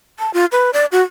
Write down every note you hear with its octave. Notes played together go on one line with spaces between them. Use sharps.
A5
F4
B4
D5
F#4